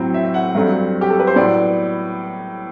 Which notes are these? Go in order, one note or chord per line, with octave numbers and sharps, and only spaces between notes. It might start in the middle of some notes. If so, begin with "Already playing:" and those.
Already playing: A2 F#3 C4
E5
E5
F#5
G2 F#3 A3 C4
G4
A4
B4
C5
A2 F#3 B3 D5